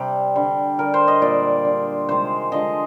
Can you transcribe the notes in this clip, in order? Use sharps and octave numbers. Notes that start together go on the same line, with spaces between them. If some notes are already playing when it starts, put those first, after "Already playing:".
Already playing: C3 G3 G4
D3 G3
D3 G3 A#4
C5
D#5
A#2 G3 D5
D3 G3
C3 D#3 G#3 C5
D3 F3 G#3 D#5